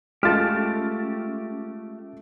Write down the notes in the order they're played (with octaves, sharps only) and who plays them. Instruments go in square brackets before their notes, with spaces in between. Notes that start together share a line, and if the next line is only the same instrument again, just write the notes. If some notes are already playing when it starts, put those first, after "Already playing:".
[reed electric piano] G#3 F4 A4 [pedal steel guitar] A3 G4 [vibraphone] C#4 [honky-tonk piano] F6 A6